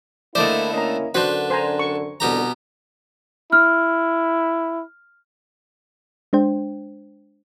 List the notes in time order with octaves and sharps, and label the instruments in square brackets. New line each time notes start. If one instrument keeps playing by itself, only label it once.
[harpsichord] D3 A3 C5 [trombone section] A#3 E4 [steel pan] D5 D#5
[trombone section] A#3 C#4 E4 [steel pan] D#5 A#5
[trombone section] F#2 D3 [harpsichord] D4 B4 [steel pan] F#4 C5 F#5
[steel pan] C5 G#5 A#5
C#6
[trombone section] C2 F2 D3 [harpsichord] B2 G4 A#5
[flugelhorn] E4 [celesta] F6
[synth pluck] G#3 D4 C5 G5